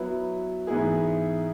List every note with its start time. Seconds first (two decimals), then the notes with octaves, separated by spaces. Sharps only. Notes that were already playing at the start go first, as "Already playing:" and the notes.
Already playing: F#3 B3 E4 B4
0.67 G#2 E3 B3 E4 G#4